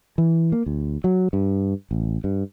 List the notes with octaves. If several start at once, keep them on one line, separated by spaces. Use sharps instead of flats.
E3
A#3
D2
F#3
G2
A1
G2